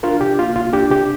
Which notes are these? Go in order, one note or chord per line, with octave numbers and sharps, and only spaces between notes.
D4 F4 A#4
C3 G4
A#3 F4
C2 F4
D4 G4
C3 G4